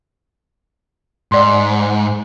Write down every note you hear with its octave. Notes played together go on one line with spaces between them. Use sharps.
G#2 D5 C6